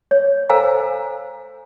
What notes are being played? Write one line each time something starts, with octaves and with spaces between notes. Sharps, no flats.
C#5
A4 C5 F5 G#5 A#5 E6